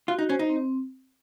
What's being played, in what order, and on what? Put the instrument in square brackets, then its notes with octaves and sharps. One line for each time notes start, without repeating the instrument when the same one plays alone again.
[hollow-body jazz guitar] F4 [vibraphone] F#4
[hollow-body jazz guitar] D#4
[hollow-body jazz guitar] C#4 [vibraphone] C5
[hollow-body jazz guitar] D#4
[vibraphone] C4